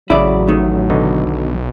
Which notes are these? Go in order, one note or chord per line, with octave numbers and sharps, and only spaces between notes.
A1 C#3 F#3 E4 D5
D#3 A3
B2 D3 D#4
B1